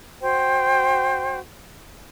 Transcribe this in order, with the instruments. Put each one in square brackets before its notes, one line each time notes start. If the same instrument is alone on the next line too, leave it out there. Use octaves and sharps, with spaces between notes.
[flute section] F#4 C5 G5